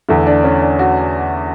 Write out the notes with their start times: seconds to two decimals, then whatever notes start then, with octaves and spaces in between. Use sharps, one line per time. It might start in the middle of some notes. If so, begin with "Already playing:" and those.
0.09 E2 D3 A3 E4
0.27 D4
0.44 C#4
0.62 D4
0.79 F#4